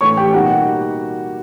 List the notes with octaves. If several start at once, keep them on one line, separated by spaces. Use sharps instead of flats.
A2 E3 A3 C#4 C#5 C#6
G4 G5
B2 G3 A#3 D#4 F#4 F#5